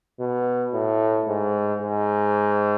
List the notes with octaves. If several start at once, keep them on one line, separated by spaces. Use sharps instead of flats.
B2
A2
G#2
G#2